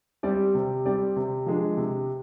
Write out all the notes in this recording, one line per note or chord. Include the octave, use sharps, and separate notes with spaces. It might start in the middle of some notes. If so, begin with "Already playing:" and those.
G3 C4 G4 D5
C3
G3 C4 G4 D5
C3
F3 G#3 D4
C3